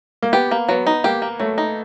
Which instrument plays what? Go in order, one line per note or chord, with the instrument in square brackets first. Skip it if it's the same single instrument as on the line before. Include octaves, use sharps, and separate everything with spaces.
[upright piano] A#3
[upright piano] B3 [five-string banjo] G4
[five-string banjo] A#3
[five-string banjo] F#3 [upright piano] B3
[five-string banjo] D#4
[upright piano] A#3 [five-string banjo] G4
[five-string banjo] A#3
[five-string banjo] F#3 [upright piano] A3
[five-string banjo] D#4